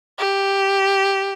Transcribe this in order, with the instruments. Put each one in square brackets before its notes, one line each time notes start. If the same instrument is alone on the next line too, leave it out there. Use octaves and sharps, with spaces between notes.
[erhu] G4